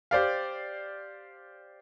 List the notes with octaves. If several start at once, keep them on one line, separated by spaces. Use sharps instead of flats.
G4 C5 D5 F5